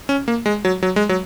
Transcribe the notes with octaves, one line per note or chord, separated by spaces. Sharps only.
C#4
A#3
G#3
F#3
F#3
G#3
F#3